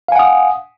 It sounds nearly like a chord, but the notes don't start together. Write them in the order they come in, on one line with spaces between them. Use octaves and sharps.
F5 G#5 F#5 D#6